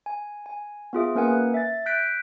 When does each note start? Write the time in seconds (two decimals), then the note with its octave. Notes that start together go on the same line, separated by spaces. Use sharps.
0.06 G#5
0.46 G#5
0.93 B3 F4 G#4 E5
1.15 A#3 C#4 A#4 B4 F#5 G#5
1.54 E5 A6
1.86 F#6 G6 B6 D7